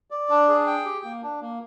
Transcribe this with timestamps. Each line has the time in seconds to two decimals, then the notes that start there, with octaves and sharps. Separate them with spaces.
0.11 D5
0.29 D4
0.48 G#4
0.66 G5
0.85 G4
1.04 A#3
1.23 D4
1.42 A#3